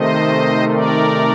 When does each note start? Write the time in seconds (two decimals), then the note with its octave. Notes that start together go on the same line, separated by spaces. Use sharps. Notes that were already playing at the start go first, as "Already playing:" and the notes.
Already playing: C3 D#3 A3 C5 D#5
0.72 A#4 D5